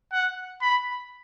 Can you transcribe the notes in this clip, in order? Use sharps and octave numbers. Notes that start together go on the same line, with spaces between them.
F#5
B5